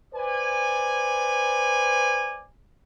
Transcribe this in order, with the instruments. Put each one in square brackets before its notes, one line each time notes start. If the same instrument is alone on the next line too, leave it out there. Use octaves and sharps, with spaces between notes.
[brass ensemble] B4 C5 D5 G#5